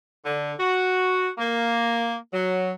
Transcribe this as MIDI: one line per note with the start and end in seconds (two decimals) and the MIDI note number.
0.25 0.53 50
0.58 1.28 66
1.38 2.14 58
2.33 2.72 54